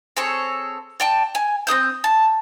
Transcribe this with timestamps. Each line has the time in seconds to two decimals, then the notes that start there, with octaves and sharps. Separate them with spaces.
0.17 C4 G#4 A4 C#5
1.00 D5 G5 A5
1.35 G#5
1.67 C4 A#4 D#6 G6
2.04 A5